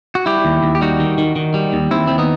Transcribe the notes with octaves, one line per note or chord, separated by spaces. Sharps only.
F#4
G3 E4 G4
D#2
D#2
G4
G3 D#4 F#4
D#3
D#3
D#3
G3
D#2
D#2 C4 E4
D#2 C4
B3 D#4